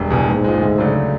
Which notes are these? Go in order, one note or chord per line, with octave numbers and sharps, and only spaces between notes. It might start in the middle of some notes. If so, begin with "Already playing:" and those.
Already playing: E1 G2
E2 B2
A#1 G#2
A#2 F3 G#3
D2
C#3 F#3 A3 D4